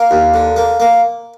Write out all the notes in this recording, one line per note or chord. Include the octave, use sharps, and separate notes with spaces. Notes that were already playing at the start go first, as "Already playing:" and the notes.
Already playing: A#3 A#4
D#2
D3
A#3
A#3